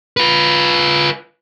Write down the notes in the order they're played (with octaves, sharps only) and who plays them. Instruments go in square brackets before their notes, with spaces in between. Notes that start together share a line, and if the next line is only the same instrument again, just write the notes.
[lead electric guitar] F4 B4